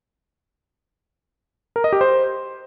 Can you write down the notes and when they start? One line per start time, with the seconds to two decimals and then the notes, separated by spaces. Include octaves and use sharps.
1.76 A#4
1.84 D#5
1.93 G4
2.01 C5